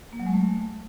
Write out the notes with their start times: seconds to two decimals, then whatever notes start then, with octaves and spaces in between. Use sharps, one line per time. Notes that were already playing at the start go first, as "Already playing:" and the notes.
0.13 A#3
0.20 F#3
0.26 G#3
0.33 A3